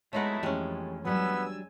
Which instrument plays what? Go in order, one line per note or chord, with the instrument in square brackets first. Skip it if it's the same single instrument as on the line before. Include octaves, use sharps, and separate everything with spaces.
[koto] F#3 D#4 F#5 [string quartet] G#3 A3 E4 [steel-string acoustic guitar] B3 B4
[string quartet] F2 [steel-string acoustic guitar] E3 A3 G4 [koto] G#3 C#4
[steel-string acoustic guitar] F#3 G3 D4 [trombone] B3 [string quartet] G#5 E6